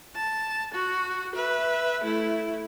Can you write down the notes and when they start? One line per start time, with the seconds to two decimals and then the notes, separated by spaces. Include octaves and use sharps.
0.15 A5
0.74 F#4
1.35 B4 E5
2.04 A3 E4